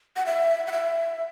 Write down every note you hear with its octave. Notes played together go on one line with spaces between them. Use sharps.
F#5
E5
F#5
E5